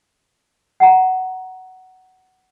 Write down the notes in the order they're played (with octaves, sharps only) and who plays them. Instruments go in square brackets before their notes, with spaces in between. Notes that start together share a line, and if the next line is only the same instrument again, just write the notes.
[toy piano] F#5 A#5